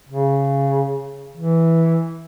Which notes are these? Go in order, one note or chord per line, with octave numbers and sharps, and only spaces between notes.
C#3
E3